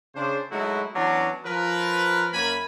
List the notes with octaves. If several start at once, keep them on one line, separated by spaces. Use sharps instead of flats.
C#3 D4 C5
F#3 G#3 A3 D#4 E4 F#4
E3 F#3 B3 C#4 D4
F3 A#4 B4
F#2 A#3 A#4 G#5 B5